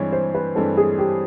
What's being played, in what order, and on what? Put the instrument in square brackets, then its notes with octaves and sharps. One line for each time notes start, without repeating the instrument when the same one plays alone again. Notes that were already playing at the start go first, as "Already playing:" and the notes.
Already playing: [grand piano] G2 E3 G#3 C4 [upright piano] C#5
[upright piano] C5
B4
[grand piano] G2 E3 G#3 C4 [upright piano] A4
[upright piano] G#4
G4